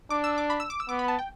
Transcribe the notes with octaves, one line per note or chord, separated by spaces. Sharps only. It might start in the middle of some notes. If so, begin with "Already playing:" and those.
D4 D6
E6
D6
B5
E6
D6
E6
B3 D6
B5
A5
G5